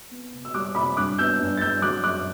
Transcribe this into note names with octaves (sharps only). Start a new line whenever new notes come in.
B3
C3
E6
G3 D6 F#6
C3 B5 D6
G2 D6 F#6
B3 E6 G6
G2
A6
G2 E6 G6
F#3 D6 F#6
F#2 D6 F#6